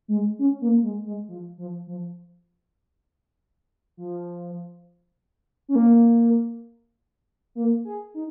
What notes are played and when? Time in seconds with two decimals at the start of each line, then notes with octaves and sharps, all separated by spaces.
0.08 G#3
0.39 C#4
0.61 A#3
0.83 G#3
1.06 G#3
1.29 F3
1.58 F3
1.87 F3
3.97 F3
5.68 C#4
5.75 A#3
7.55 A#3
7.85 G#4
8.14 D#4